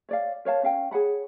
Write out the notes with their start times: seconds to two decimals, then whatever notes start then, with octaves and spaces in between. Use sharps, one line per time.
0.09 C#5 D5 F5
0.45 A#4 C#5 F5 A5
0.63 C#4 F5 G5
0.91 G#4 C#5 F#5 B5